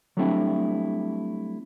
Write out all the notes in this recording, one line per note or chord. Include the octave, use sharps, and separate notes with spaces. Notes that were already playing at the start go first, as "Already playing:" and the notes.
F#3 G3 A3 C4 D4 E4